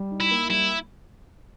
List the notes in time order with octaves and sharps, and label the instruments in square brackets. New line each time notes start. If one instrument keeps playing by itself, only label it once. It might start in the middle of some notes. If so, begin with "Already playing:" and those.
Already playing: [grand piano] G3
D#4
[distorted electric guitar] E4
[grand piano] A#3
[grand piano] G3 [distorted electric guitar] E4